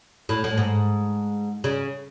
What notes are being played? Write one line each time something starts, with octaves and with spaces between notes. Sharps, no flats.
A2
A2
G#2
C#3